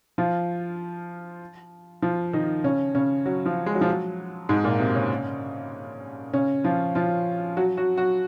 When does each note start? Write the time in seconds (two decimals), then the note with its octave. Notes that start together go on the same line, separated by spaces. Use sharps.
0.18 F3 F4
2.02 F3 F4
2.33 D#3 D#4
2.64 C#3 C#4
2.95 C#3 C#4
3.26 F#3
3.46 F3
3.66 G#3
3.74 F#3
3.81 F3
3.89 F#3
4.49 G#2 G#3
4.64 A#2 A#3
4.79 C3 C4
4.95 C#3 C#4
6.33 C#3 C#4
6.64 F3 F4
6.95 F3 F4
7.57 F#3 F#4
7.77 F#3 F#4
7.97 F#3 F#4